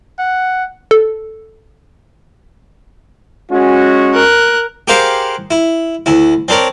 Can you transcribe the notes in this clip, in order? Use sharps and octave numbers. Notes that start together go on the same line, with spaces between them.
F#5
A4
G#3 C#4 F#4
A#4 F#6
G4 G#4 A#4 C5 F5 F#5
E4
D2 E4
C4 D4 A#4 C#5